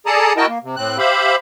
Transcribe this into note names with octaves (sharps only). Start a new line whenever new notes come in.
G#4 A4 D5 A5 A#5 D#6
E4 F#4 A#4 D#5 G5 A5
A#3
C3
A2 C4 F#6
G4 C5 E5 F5 B5